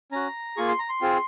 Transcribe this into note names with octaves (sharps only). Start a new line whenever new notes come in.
C#4 F#4 A#5
A#3 F4 G#4 C#6
C6
A#5
C6
C4 F4 G#4